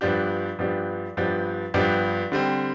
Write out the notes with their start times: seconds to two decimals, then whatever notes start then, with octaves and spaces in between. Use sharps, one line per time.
0.01 G2 F3 B3 D4 G4
0.59 G2 F3 B3 D4 G4
1.17 G2 F3 B3 D4 G4
1.74 G2 F3 B3 D4 G4
2.32 D3 G3 C4